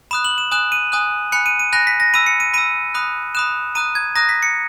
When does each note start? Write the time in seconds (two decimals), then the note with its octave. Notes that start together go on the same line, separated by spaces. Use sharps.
0.11 B5 D#6 F#6 E7
0.25 F#7
0.38 E7
0.51 G#5 D#6 F#6 E7
0.72 D#7
0.92 G#5 D#6 F#6
1.32 G#5 B5 F#6 C#7
1.46 D#7
1.59 D#7
1.73 G#5 B5 F#6 A#6
1.87 B6
2.00 A#6
2.14 B5 E6 D#7
2.27 C#7
2.40 D#7
2.54 B5 E6 D#7
2.94 B5 D#6 F#6
3.35 B5 D#6 F#6 E7
3.75 A#5 D#6 F#6 D#7
3.95 G#6
4.16 A#5 D#6 F#6 A#6
4.29 B6
4.43 C#7